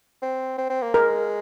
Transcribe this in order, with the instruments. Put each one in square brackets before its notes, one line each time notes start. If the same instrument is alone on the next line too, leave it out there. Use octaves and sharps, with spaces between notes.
[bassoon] C4
C4
C4
A#3
[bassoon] G#3 [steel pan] A#4